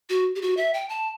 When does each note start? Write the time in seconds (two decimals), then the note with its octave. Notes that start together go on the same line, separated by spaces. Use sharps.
0.09 F#4
0.36 G4
0.42 F#4
0.57 E5
0.74 G5
0.89 A5